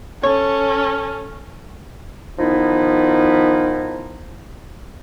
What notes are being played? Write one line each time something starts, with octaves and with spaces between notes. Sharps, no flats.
C#4 A4 C#5
D#3 F3 B3 D#4 E4